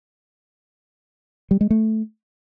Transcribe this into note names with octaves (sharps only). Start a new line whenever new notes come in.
G3
G#3
A3